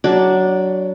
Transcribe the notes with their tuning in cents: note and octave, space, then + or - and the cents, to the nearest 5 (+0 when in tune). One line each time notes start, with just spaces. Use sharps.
F#3 +15 D4 -5 D5 +0